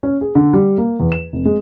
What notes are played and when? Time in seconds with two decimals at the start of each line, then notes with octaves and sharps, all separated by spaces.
0.03 C#4
0.21 G#4
0.35 D3
0.53 G3
0.78 A#3
1.00 E2
1.12 E7
1.33 F1
1.45 G#3